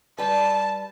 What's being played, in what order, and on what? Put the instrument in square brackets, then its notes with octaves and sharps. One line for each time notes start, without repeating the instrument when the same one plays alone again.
[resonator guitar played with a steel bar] G3 B4 [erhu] A5